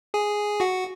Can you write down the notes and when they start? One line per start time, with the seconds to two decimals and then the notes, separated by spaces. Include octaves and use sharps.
0.14 G#4 G#5
0.60 F#4 F#5